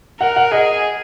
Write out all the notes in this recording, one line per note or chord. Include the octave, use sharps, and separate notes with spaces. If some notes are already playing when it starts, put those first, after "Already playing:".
A#4 F#5
F#5
G#4 D#5